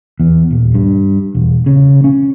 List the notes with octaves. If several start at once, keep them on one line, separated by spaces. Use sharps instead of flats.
E2
D#1
G2
E1
C#3
C#4